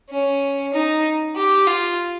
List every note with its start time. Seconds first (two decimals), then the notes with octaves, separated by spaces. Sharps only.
0.10 C#4
0.74 D#4
1.36 G4
1.67 F4